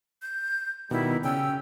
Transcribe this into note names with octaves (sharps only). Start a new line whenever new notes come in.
G6
B2 D#3 G3 E4
C#3 C#4 G5 E6